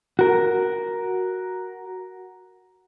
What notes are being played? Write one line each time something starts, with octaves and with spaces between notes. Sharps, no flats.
F#4 A#4